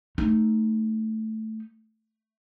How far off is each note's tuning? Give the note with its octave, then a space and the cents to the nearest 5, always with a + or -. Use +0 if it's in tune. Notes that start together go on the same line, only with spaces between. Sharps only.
A3 +0 D#4 +0